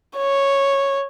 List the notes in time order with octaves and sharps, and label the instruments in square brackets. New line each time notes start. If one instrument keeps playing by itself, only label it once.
[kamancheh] C#5